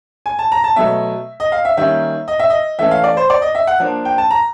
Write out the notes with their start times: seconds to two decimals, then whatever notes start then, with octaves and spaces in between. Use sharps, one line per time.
0.26 G#5
0.39 A5
0.52 A#5
0.64 A5
0.76 B2 F#3 A3 E5
1.40 D#5
1.52 F5
1.65 E5
1.77 D#3 G3 A#3 C#4 E5
2.28 D#5
2.40 E5
2.50 D#5
2.79 E3 A3 C#4 E5
2.91 F5
3.04 D5
3.17 C5
3.30 D5
3.42 D#5
3.55 E5
3.67 F#5
3.80 F3 A#3 D4
4.05 G5
4.18 A5
4.31 A#5